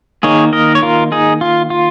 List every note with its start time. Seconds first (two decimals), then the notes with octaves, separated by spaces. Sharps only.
0.23 D#3 A#3 D#4 G#4 C#5
0.53 A#4 D#5
0.75 C#5
0.82 F4 A#4
1.12 D#4 G#4
1.41 F4
1.70 F4